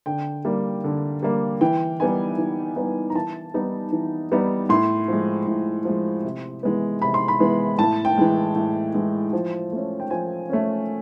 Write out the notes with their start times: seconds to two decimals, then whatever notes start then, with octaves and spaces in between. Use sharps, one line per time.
0.06 D3 G5
0.45 G3 A#3
0.84 D3
1.23 G3 A#3
1.61 E3 G5
2.00 G3 B3 D#4 G#5
2.38 E3
2.76 G3 B3 D#4
3.10 A#5
3.15 E3 A5
3.54 G3 B3 D#4
3.92 E3
4.32 G3 B3 D#4
4.69 A2 C6
5.08 F3 G#3
5.47 A2
5.85 F3 G#3
6.24 C3
6.63 E3 G#3 B3
7.02 C3 B5
7.14 C6
7.28 B5
7.40 E3 G#3 B3
7.79 A2 A5
8.05 G5
8.18 E3 G#3
8.55 A2
8.94 E3 G#3
9.33 F3
9.72 A3 C#4
10.00 G5
10.10 F3 G#5
10.49 A3 C#4